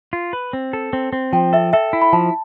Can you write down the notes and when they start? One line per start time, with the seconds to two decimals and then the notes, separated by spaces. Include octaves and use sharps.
0.13 F4
0.33 B4
0.53 C4
0.73 A4
0.93 C4
1.13 C4
1.33 F3 G5
1.53 A4 E5
1.73 A4 E5
1.93 E4
2.02 B5
2.13 F3 A5